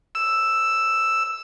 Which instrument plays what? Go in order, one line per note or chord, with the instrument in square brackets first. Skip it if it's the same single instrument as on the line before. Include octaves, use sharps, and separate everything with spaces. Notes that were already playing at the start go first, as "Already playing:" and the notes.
[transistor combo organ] E6